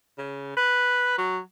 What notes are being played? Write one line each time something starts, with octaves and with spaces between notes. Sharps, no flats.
C#3
B4
F#3